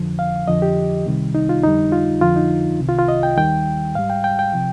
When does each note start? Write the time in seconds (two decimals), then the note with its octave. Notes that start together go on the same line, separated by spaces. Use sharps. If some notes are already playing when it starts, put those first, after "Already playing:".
Already playing: F2 D3 F3
0.19 F5
0.48 F2 D3 F3 D#5
0.62 G4
1.05 C2 C3 D#3 G3
1.35 D#4
1.49 F4
1.63 F2 D3 G3 D#4
1.92 F4
2.21 F2 D3 F3 F4
2.36 D#4
2.80 C2 C3 D#3
2.88 F4
2.99 F4
3.08 D#5
3.23 G5
3.37 D#2 D#3 G3 G5
3.95 G#2 G3 F5
4.10 G5
4.24 G5
4.39 G5
4.54 C3 F3